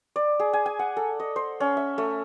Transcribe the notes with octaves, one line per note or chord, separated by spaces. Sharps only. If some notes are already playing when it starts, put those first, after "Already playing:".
D5
G#4
G#5
G#5
F#5
A4
D#5
C5
C#4
E5
A3